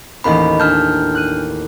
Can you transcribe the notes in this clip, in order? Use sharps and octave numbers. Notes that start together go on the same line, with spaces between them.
A1 D#2 C5 D#5 B5
D4 A5 F6 G6
F#6 D#7